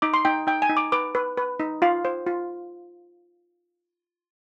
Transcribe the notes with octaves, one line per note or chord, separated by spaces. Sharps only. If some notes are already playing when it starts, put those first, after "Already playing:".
D#4 D6
C6
D#4 G5
D#4 G5
G#5
D#4
D6
B4 D6
B4
B4
D#4
F4 F5
C5
F4